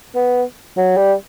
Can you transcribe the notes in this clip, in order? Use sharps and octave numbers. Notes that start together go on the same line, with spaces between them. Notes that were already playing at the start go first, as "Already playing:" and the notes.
B3
F#3
G3